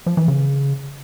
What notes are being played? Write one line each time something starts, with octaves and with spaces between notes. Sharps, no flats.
F3
E3
C#3